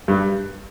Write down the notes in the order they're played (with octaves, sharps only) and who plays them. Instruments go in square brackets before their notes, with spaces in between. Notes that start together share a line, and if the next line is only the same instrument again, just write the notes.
[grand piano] G2